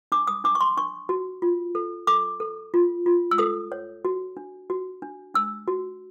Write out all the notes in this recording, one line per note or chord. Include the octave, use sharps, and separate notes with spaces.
D4 D6
D#6
D4 D6
C#6
C6
D4 C#6
F#4
F4
A4
A4 D6
A4
F4
F4
E6
A4 D#6
C#5
F#4
D4
F#4
D4
D4 E6
F#4